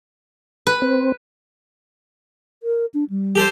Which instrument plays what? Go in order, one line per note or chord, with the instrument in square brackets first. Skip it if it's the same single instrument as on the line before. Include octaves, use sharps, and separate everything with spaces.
[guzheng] B4
[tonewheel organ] C4
[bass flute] A#4
D4
G3
[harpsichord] G4 A4 C5